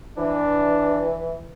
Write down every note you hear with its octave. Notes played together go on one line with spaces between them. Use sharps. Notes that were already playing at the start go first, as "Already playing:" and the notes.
E3 D4